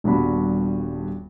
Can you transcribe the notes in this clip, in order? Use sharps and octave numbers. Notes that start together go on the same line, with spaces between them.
D#1 G2 A#2 B3 F#4 B5